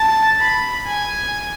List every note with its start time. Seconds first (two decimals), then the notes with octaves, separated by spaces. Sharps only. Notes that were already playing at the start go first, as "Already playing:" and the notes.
Already playing: A5
0.40 B5
0.87 G#5